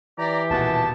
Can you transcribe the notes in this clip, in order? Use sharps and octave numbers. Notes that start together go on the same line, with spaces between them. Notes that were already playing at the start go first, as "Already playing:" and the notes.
E3 G4 D5 A#5
D#1 B2 F#5 A5